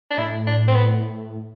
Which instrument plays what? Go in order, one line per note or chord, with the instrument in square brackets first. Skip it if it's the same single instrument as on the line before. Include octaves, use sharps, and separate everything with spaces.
[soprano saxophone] D4
[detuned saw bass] A2 [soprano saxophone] E4
[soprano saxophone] D4
C4
B3